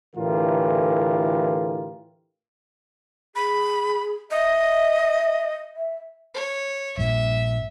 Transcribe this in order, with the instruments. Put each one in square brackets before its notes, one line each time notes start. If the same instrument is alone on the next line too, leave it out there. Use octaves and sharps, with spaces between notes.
[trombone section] A2 D3 E3 F4 G4 A#4
[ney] G#4 [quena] B5
[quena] D#5 [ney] E5
[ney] E5
[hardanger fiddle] C#5
[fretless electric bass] A#1 G2 A#2 [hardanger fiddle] E5